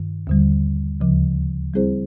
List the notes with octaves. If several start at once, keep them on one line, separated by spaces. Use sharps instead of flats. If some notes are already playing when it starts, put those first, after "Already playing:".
Already playing: G2 D#3
D#2 D3 G3
D2 C#3 F3
G3 C4 E4 G#4 C5